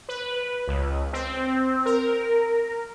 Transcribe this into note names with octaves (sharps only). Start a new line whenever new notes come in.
B4
C#2
C4
A#4